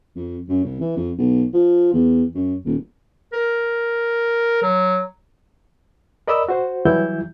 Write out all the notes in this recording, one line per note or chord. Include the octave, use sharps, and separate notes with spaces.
F2
F#2
C2
E3
F2
B1
F3
E2
F#2
D#1
A#4
F#3
A#4 D5 D#5 B5 E6
F#4 C5
E3 F#3 G3 E4 G6